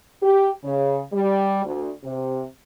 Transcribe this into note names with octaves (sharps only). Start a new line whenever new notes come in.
G4
C#3
G3
D2
C3